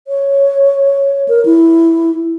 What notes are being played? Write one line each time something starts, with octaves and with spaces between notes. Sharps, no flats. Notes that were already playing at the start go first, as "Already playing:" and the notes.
C#5
A#4
E4